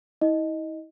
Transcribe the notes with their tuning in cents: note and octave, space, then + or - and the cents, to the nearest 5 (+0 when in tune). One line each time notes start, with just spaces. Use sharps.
E4 -40 D#5 +0